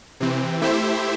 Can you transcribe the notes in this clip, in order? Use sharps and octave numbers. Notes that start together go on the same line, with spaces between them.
C3 E3 C4
A3 E4 G4 C5 E5